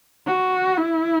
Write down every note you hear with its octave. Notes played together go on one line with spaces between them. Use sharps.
F#4
E4